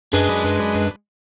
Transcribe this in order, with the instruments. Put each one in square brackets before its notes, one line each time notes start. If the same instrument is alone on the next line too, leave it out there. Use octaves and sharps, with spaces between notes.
[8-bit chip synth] F#2 D4 B4 [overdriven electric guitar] G#3